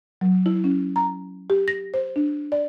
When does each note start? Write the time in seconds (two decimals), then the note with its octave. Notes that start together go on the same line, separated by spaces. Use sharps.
0.21 F#3
0.46 E4
0.64 C#4
0.96 A#5
1.50 G4
1.68 A#6
1.94 C5
2.16 D4
2.52 D5